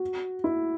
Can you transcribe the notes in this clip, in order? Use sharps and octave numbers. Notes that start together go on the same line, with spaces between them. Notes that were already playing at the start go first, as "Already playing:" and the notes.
Already playing: F#4
E4